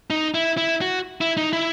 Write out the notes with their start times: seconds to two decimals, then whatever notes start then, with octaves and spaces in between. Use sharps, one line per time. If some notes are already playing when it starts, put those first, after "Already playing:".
0.10 D#4
0.35 E4
0.57 E4
0.81 F#4
1.21 E4
1.37 D#4
1.53 E4